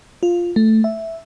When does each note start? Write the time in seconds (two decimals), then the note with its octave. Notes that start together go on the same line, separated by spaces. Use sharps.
0.23 F4
0.56 A3
0.84 E5